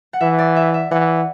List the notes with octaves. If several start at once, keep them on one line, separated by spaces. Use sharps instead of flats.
F#5
E3 E5
D5
E5
E5
E3 F#5